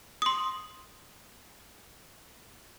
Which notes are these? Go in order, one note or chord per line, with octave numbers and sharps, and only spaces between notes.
C6 D#6